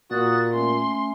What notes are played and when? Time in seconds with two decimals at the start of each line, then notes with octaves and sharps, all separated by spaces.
0.11 A#2 F#4 D#6 F#6 A6
0.53 A3 C#4 C6